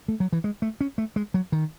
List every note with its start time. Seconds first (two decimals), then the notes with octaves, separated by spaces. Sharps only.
0.08 A3
0.20 F#3
0.32 E3
0.44 G#3
0.62 A3
0.81 C#4
0.98 A3
1.16 G#3
1.34 F#3
1.52 D#3